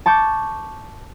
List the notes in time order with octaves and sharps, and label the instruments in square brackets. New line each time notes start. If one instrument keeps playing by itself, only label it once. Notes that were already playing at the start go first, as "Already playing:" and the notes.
[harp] A5 C#6 D6 G6 A6